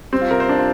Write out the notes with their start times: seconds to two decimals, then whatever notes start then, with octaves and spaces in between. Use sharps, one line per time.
0.13 G3 C4
0.21 F4
0.31 C3 A#4
0.40 C5
0.49 D4
0.58 F4